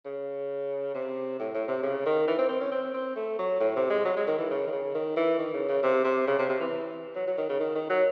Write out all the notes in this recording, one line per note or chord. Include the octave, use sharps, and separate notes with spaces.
C#3
C3
A2
A2
C3
C#3
D#3
E3
C4
C4
C#4
C4
C4
A3
F#3
A2
C3
G#3
F#3
G#3
D#3
E3
C#3
D#3
C#3
D#3
E3
D#3
C#3
C#3
C3
C3
C#3
C3
C3
E3
F#3
F#3
D#3
C#3
D#3
D#3
F#3